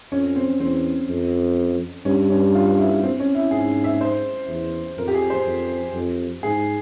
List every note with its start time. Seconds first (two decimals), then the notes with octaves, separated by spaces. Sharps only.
0.12 F2 C#4
0.36 C4
0.60 E2 C4
1.09 F2
2.05 G2 C#4
2.30 C#4
2.55 F4
2.78 E4
3.03 C4
3.20 C#4
3.35 E4
3.51 G#2 G#4
3.84 E5
4.01 C5
4.49 E2
4.97 F2 A#4
5.08 G4
5.14 G#4
5.30 C5
5.46 F2
5.94 F2
6.43 G#2 G#4